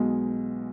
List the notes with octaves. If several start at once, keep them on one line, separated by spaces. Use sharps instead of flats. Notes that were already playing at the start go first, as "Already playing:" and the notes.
Already playing: B1 B2 G#3